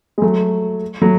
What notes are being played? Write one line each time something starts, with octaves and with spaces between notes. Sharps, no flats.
G#3
F#3 A3
F#3 A3